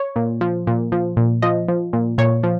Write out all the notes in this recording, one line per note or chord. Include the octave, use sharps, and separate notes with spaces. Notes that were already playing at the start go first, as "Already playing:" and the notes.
Already playing: C#5
A#2
F3
A#2
F3
A#2
F3 D#5
F3
A#2
A#2 C#5
F3